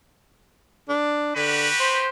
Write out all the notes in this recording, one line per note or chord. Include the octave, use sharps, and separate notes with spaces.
D4
D3 F#4 G4 B4
C5